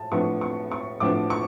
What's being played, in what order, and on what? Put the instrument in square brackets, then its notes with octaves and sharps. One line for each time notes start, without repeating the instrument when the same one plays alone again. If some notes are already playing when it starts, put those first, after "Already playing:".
Already playing: [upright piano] A2 A5
A2 F3 B3 D4 C#6
C#6
C#6
A2 F3 B3 D4 D6
C#6